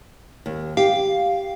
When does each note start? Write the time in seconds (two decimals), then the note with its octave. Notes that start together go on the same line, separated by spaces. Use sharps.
0.46 D#2
0.77 G4 F5